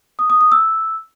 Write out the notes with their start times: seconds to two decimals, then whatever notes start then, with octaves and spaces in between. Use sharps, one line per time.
0.19 D#6
0.30 D#6
0.41 D#6
0.52 E6